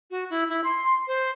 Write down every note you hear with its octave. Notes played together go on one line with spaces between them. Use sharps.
F#4
E4
E4
C6
C5